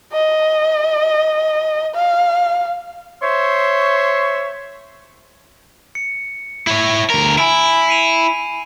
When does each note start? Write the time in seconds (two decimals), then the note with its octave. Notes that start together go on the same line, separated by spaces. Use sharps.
0.12 D#5
1.94 F5
3.22 C5 C#5 E5 C6 C#6
5.95 C#7
6.67 E4 C#5
7.10 D2 A#4
7.38 E4 G#5 B5 D7
7.88 C7 D#7 F7